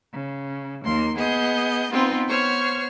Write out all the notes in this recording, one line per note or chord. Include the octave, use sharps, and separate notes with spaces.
C#3
D#2 A#3 C6
B3 G#4 D#5 G6
B3 C4 D#4 F4 B4
B3 C5 C#5 C#6 F6